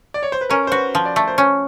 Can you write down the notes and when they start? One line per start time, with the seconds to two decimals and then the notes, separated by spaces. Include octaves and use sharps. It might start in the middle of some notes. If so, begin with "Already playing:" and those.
0.14 D5
0.23 C#5
0.32 C5
0.41 B4
0.50 C#4 A#4
0.67 C5
0.71 F#4 B4
0.95 F3
1.05 D5
1.16 A3
1.28 C5
1.38 C#4